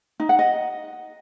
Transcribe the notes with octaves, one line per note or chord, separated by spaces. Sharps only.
D#4
F#5
D#5